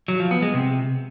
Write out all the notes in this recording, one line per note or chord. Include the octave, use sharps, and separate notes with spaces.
F#3
F3
B3
G#3
C3